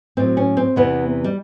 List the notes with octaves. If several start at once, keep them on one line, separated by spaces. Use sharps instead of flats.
A2 F#3 C4
C#4
C4
E2 C3 E3 B3
G3